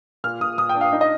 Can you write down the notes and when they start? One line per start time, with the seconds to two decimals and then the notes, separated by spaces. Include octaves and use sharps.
0.24 A#2 F6
0.40 A#2 D#6
0.58 A#2 D#6
0.69 G5
0.75 D4
0.81 F5
0.93 D#4
1.01 D#5